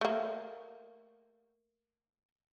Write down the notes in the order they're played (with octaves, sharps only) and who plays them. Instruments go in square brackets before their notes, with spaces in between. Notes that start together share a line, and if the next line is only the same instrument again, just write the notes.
[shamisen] A3 A#3